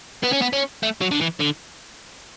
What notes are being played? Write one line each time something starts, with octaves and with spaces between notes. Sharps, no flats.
B3
C#4
B3
C#4
A3
F#3
D3
E3
D3